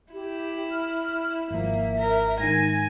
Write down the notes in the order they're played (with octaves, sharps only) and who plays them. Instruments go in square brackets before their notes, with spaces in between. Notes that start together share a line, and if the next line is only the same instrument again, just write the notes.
[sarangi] E4 [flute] G4
[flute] F6
[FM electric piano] G#1 F3 [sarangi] A#3 [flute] E5
[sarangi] A#4
[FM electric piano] G#2 D#3 [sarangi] G#5 [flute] A#6